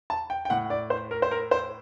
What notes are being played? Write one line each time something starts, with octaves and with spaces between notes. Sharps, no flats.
A5
G5
G5
A2 F#5
D5
C5
A#4
C5
A#4
C5